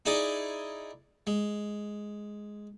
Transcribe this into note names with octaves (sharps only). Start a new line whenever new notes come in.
D#4 E4 G#4 D5 D#5
G#3